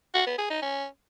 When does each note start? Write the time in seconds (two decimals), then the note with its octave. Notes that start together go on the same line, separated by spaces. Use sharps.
0.14 F#4
0.26 B3
0.38 G#4
0.50 D#4
0.62 C#4